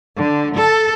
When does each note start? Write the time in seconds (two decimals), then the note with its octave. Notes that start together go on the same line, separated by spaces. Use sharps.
0.18 D3
0.55 A4